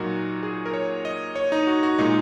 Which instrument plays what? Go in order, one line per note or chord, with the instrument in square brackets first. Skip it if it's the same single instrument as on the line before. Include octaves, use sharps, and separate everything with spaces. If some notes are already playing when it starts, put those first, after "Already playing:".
Already playing: [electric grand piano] A#2 F#3 D#4 F#4 A#4
G#4
A#4
C#5
D#5
C#5
D#4
F#4
F#4
A#2 G#3 D#4